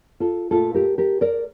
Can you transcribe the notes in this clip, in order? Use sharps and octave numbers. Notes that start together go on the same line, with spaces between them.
F4 A4
A#2 A3 F4 A4
G4 A#4
G4 A#4
A#4 D5